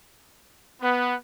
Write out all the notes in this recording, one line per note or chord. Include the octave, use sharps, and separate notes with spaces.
B3